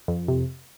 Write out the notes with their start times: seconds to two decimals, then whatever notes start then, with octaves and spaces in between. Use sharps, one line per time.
0.08 F2
0.28 C3